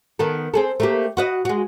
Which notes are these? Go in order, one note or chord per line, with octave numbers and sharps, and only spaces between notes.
D#3 B3 A4
C4 G#4 A4
A3 A#3 G4
F#4 B4 D#5
G#3 F#4